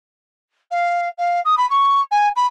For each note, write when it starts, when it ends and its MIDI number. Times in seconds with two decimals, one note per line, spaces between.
0.71 1.08 77
1.18 1.40 77
1.45 1.55 87
1.57 1.68 83
1.70 2.01 85
2.11 2.29 80
2.36 2.46 83